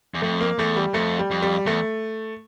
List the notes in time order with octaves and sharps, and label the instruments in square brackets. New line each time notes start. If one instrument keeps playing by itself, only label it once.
[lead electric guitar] E2
[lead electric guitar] F2 [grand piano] A3
[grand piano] A#3
[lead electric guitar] E2 [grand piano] A3
[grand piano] G3
[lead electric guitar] F2 [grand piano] A3
[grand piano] G3
[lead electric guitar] F2
[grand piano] G3
[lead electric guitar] E2 [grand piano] A3